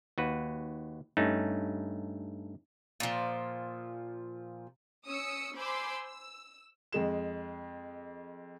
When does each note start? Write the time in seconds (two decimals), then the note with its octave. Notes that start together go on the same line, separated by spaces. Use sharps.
0.18 D#2 F#4 B4
1.17 G2 A3 C#4 D#4
3.00 A#2 F3
5.06 C#4 D#6 E6 C#7
5.56 C5 G#5 B5 C6 D6 E6
6.05 E6
6.92 F2 G#3 E7